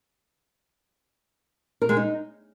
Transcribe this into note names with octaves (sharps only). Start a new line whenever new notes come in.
A#4
G#3
D#4